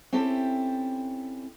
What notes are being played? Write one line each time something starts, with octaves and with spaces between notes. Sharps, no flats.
C4 C#4 E4 G4 A4